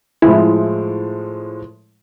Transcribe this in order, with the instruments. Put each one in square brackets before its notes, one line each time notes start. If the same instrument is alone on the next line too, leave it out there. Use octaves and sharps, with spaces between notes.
[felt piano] A2 F3 G#3 [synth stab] E4